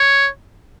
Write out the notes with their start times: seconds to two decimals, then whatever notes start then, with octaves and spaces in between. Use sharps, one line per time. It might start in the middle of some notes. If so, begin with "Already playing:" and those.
Already playing: C#5